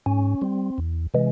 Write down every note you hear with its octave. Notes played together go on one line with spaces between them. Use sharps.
G#2 C#4
G3 C4
E2
C3 E3 G#3